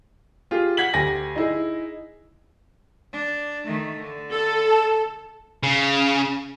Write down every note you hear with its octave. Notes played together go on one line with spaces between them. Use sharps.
F4 G4 G#4
F#5 G#6 B6 F#7
D2 G4 G#5 A#6
D#4 E4 G#4
D4
D#3 A3
D3
A4
A5
C#3